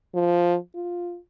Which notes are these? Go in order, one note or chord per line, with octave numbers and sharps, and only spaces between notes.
F3
F4